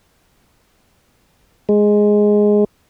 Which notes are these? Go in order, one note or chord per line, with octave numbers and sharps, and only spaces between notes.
G#3